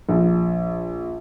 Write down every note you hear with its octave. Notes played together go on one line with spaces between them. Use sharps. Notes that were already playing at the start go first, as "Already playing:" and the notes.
A#1